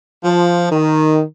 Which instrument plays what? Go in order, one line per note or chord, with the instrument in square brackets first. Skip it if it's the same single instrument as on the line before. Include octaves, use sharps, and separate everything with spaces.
[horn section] F3
D#3